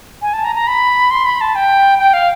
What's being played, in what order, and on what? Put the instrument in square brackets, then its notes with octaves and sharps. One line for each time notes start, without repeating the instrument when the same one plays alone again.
[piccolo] G#5
A5
A#5
A#5
B5
C6
B5
A5
G5
G5
F5